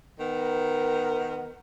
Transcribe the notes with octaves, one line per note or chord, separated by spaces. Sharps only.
D#3 B3 A#4